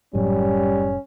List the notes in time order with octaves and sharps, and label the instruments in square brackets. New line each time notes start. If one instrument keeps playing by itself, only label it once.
[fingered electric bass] F#1 A2 F#3 [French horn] G3 [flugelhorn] C#4